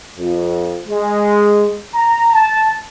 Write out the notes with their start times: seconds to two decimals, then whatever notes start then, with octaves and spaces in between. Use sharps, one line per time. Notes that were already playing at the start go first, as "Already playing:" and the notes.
0.17 F2
0.88 G#3
1.94 A#5
2.32 A5